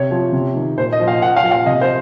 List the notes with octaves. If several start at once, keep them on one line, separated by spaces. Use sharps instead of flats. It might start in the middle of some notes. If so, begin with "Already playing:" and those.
Already playing: C3 C#5
F3
C3
D#3
A#2 C5
D#5
F3
F5
A#2 F#5
F5
F3
F5
C3 D#5
C5